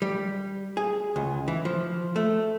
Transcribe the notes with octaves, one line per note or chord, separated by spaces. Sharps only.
G3
G#4
C#2
E3
F3
A3